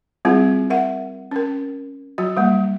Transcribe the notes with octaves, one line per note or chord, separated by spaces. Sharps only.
G3 G#3 C4 E4 F4 G#4
A#4 E5 F#5
C#4 A#4
F#3 F#4
G3 G#3 A#3